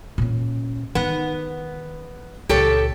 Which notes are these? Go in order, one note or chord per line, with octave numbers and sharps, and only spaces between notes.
A#2 C#4
D#3 B3 D#4
C#2 A#2 G4 A4 C#5